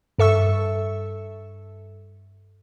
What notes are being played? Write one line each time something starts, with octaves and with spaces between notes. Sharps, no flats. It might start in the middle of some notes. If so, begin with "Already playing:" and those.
G2 A4 E5 C#6 E6